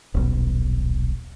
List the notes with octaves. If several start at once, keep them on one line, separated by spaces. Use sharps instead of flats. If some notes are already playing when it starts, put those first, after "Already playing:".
D#1 B1